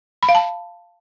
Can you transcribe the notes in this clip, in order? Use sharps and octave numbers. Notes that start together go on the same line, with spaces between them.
B5
F5
A5